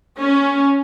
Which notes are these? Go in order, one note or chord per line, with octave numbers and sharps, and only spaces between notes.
C#4